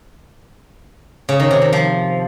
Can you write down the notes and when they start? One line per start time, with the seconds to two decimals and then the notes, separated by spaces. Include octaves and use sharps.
1.29 C#3
1.40 D#3
1.51 C3
1.62 D#3
1.73 F3